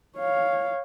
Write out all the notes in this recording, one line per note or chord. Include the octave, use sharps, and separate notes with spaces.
C#5 F5